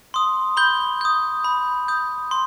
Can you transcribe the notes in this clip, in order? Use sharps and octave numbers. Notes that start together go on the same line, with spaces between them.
C6 D#6
B5 G6 G7
D#6 G6
B5
D#6 G6
C6